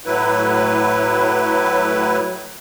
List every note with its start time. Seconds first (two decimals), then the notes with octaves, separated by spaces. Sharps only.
0.06 A2 F#3 E4 B4